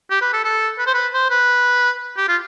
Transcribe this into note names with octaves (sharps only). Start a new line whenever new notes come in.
G4
B4
A4
A4
B4
C5
B4
C5
B4
G4
F4